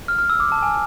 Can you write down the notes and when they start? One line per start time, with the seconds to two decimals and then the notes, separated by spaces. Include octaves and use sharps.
0.08 F6
0.18 F6
0.30 E6
0.40 D6
0.52 A5
0.63 G#5